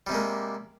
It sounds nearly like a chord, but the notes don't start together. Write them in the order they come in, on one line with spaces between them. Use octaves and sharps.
G3 C3 G#3 A#3